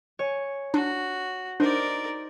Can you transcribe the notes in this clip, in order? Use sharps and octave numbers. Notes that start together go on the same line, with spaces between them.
C#5 G#5
D4 F#4
D4 D#4 A#4 C5 D5